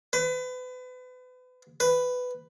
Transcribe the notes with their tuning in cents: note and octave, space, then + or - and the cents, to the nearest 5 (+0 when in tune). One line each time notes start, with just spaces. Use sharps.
B4 +35
B4 +10